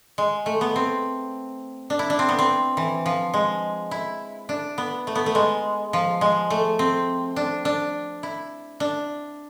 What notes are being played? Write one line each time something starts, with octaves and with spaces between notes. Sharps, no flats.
G#3
A3
B3
C4
D4
E4
D4
C4
B3
C4
E3
F3
G#3
E4
D4
B3
A3
B3
A3
G#3
F3
G#3
A3
C4
D4
D4
E4
D4